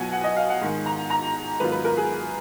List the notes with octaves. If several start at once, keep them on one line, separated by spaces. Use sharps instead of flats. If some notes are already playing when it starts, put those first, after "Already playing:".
Already playing: B2 F#3 B3 F4 F#5 G#5
F#5
D#5
F5
F#5
G#2 D#3 G#3
A#5
A#5
G#2 D#3 F#3 B3 F4 B4
B4
A#4
G#4